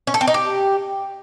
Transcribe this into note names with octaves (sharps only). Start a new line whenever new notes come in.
C#4
A4
C4
D#4
G4